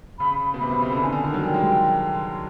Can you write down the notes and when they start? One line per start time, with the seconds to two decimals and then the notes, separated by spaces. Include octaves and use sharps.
0.19 C#3 B5
0.54 B2
0.60 C3 B5
0.71 C3
0.82 C#3 B5
0.92 D3
1.02 D#3 G#5
1.12 D3
1.23 D#3
1.34 F#3
1.43 G3 G5
1.54 G#3